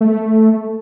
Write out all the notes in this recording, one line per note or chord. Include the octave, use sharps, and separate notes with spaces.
A3